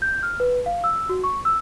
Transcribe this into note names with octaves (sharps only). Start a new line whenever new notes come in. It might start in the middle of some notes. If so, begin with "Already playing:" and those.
G6
F6
B4
F5
E6
F#4
C#6
E6